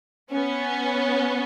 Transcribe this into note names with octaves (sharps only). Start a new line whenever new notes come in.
B3 C#4